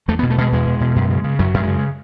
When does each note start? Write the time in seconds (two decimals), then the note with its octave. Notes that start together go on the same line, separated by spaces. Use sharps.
0.08 E2 A3
0.19 B2 B3
0.30 A3
0.38 B2 G#3
0.52 E2 G#3
0.66 E2
0.81 B2
0.96 F#2
1.10 C#3
1.24 C#3
1.39 F#2 F#3
1.54 F#2
1.60 G#3
1.68 C#3